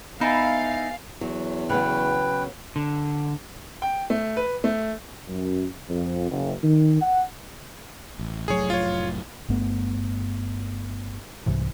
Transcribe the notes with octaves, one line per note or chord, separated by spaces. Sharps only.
B3 D#4 E4 F5 G#5 A6
E2 F#3
C#3 F#3 B3 B4 G5
D3
G5
A3
B4
A3
F#2
F2
F#1
D#3
F#5
A1
F1 A2 F#3 G#4 C#5
F4 C#5
G1 G2 A3 B3
C2 G#2 C3 E3